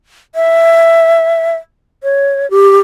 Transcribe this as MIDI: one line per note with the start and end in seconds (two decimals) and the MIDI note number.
0.35 1.55 76
2.03 2.49 73
2.51 2.80 67